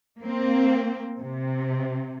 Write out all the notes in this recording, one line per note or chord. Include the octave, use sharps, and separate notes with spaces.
A#3 C4
C3